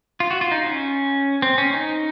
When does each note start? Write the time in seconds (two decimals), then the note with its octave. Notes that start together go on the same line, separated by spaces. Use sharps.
0.20 F4
0.31 F#4
0.41 F4
0.51 D#4
0.66 C#4
1.42 C4
1.58 C#4
1.73 D#4